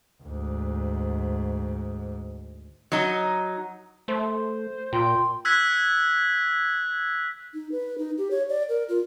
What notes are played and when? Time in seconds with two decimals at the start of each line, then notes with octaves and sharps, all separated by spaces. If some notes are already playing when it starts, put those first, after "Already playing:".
0.23 D2 G#2
2.92 F#3 D#4
4.08 A3 C5
4.93 A#2 F4 G5 C6
5.45 E6 F#6 G#6 B6
7.54 D#4
7.72 B4
7.98 D#4
8.18 G4
8.31 C#5
8.49 D5
8.69 A#4
8.89 F4